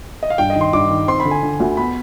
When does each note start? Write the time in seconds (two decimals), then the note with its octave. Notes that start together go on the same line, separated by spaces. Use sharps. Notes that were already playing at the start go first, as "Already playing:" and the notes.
0.23 D#5
0.30 F5
0.38 G2 G5
0.50 D#5
0.56 D#3
0.61 C6
0.73 G2 D6
0.90 D#3
1.08 C4 C6
1.20 B5
1.25 D3
1.31 G#5
1.43 D3
1.60 D2
1.77 B3 B5